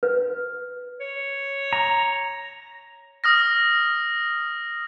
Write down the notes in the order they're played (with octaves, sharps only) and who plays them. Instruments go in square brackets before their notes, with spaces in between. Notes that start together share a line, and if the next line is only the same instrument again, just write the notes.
[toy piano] B4
[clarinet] C#5
[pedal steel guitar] A#5
[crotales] D#6 F6 A#6